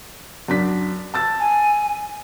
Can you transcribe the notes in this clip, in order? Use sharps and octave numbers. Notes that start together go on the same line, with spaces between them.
F#2 D4 B6
A5 E6 A6
G#5